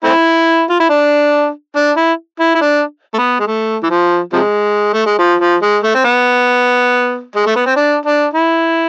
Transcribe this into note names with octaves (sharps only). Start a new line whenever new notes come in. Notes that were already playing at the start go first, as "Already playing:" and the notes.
A3 C4 E4
F4
E4
D4
D4
E4
E4
E4
D4
A3
B3
G#3
A3
E3
F3
C3 F3 G#3
A3
G#3
F3
F3
G#3
A3
C4
B3
G#3
A3
B3
C4
D4
D4
E4